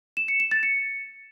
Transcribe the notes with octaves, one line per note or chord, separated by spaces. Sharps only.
E7
C#7
E7
A6
C#7